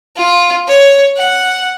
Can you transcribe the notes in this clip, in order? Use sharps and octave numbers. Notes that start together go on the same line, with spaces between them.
F4
C#5
F#5